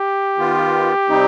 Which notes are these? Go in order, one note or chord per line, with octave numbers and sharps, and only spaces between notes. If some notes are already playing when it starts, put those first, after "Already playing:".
Already playing: G4
D#3 B3 F4
C3 G3 C4 D#4